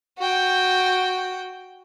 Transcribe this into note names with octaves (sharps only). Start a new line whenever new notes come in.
F#4 G5